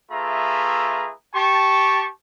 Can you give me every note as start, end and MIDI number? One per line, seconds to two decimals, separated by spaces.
0.11 1.11 57
0.11 1.11 65
0.11 1.11 68
0.11 1.11 71
0.11 1.11 76
0.11 1.11 82
1.34 2.08 67
1.34 2.08 81
1.34 2.08 85